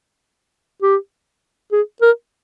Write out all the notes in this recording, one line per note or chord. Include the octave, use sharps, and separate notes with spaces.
G4
G#4
A#4